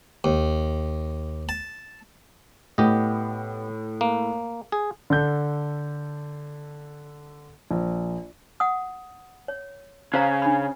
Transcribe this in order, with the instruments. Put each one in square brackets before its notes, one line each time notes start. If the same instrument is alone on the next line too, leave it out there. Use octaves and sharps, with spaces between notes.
[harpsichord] D#2
A5
[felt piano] A2 [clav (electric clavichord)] B3 G4 D#5
[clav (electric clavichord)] A#3
G#4
[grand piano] D3 A4 G6
A#1
[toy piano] F#5 D#6
C#5
[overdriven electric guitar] C#3 [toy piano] C5 F5 A#5
[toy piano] D4 B5